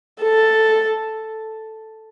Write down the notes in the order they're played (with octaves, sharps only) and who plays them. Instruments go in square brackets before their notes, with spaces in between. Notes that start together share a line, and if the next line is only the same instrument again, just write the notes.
[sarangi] A4